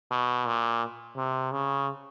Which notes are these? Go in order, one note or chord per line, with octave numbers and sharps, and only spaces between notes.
B2
A#2
C3
C#3